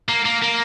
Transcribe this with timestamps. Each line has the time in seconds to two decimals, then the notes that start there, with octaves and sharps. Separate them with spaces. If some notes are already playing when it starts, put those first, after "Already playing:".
0.09 A#3
0.25 A#3
0.42 A#3